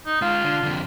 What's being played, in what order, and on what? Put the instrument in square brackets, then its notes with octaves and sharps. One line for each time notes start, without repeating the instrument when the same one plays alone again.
[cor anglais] D#4
[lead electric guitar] G#3 F5 [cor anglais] F4
[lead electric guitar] D3
F2 D3